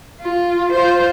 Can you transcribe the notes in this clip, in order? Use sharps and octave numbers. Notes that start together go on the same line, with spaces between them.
F4
F4 C5